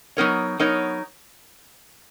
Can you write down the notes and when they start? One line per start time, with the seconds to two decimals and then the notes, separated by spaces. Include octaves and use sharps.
0.17 F#3 B3 D#4 A#4 C#5
0.59 F#3 B3 D#4 A#4 C#5